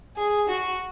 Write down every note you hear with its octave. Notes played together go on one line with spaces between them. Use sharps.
G#4
F#4